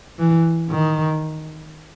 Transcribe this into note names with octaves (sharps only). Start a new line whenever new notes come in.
E3
D#3